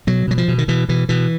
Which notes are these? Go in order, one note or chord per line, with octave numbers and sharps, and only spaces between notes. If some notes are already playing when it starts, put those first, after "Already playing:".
B2 F#3
B2 F#3
F3
B2
D#3
B2 E3
B2 E3
B2 E3